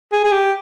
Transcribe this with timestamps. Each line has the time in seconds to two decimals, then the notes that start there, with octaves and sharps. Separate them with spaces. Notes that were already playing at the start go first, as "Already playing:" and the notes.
0.12 G#4
0.24 G#4
0.32 G4